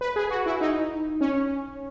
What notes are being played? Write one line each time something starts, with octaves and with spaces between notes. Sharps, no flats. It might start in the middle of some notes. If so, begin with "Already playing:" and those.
B4
G#4
F#4
E4
D#4
C#4